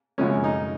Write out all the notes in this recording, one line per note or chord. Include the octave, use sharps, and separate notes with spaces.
F#2 C#3 F3 G#3 C#4
D#4